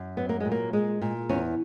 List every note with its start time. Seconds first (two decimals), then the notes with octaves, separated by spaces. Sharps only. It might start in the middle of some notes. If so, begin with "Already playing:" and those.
Already playing: F#2
0.17 F#3 B3
0.29 A#3
0.40 A#2 G#3
0.52 A#3
0.73 G#3
1.02 A#2
1.29 E2 C#4